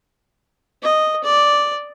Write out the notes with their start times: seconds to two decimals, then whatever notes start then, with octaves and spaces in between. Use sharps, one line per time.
0.83 D#5
1.24 D5